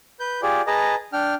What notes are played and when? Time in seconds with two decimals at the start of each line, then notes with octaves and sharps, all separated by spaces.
0.20 B4 G6
0.42 F4 G4 G#4 D5
0.67 G#4 B4 D#5 A5 A#5
1.13 D4 G5 F6